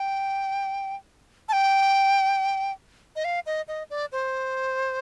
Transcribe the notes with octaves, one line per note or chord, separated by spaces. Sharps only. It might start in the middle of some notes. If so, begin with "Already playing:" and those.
Already playing: G5
A5
G5
D#5
F5
D#5
D#5
D5
C5